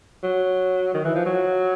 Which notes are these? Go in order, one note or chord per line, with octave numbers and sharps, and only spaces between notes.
F#3
D#3
E3
F3
F#3